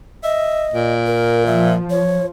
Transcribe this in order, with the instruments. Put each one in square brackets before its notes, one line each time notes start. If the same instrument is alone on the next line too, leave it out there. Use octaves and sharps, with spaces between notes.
[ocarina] D#5 [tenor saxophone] E5
[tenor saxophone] A#2
[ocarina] A#4
[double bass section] F3 [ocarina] E5
[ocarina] C#5